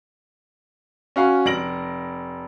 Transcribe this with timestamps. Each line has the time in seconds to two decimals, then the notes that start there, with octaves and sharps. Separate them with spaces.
1.16 C#4 F#4 F5 G#5
1.46 F1 A#6 D7 F#7